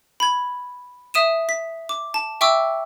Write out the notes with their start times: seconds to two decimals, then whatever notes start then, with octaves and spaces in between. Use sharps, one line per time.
0.20 B5 G#6
1.14 E5 D#6 D#7 E7
1.49 B6
1.89 D6
2.14 A5
2.41 E5 G5 C#6 D6 E6